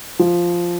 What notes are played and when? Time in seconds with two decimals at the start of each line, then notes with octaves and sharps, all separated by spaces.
0.19 F3